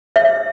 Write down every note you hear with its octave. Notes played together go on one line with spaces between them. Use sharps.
E5